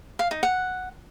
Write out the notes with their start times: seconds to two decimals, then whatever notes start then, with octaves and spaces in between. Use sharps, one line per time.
0.19 F5
0.31 D#4
0.43 F#5